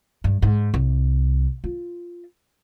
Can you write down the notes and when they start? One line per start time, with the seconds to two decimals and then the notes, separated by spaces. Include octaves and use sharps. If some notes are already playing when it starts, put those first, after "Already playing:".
0.24 G2
0.42 G#2
0.74 C2
1.64 F4